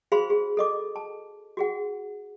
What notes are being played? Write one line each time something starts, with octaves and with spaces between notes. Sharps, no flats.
F#4 G#4 C5 F5 B5 C6
G#4
A4 D#5 D6
A5
F#4 G#4 F#5